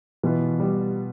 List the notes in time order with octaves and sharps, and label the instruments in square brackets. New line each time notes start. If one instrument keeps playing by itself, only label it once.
[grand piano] B2 B3 F4 B4 [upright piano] E3
[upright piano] G3